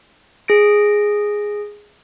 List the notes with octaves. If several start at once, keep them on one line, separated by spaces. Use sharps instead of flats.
G#4 A#6 D7